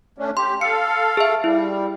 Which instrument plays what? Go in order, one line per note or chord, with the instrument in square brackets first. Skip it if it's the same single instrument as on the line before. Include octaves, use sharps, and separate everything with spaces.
[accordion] A3 C#4 D4
[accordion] G4 [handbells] C6
[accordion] A4 F5 [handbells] C#7
[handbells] G#4 E5
[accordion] G3 [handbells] E4